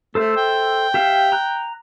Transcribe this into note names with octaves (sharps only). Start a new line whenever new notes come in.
A3 A4 C5 E5
G5
G4 E5 F5
A#5 F#6